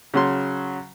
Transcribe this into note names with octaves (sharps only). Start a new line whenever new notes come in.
C#3 F#3 C6